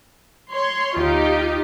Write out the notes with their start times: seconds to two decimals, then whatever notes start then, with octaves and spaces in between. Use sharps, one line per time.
0.51 C#5 C6
0.97 D2 D#4 F4 G4